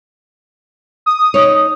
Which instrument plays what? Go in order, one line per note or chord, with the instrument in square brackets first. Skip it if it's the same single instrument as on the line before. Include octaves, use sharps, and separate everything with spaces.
[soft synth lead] D#6
[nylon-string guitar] D#4 C#5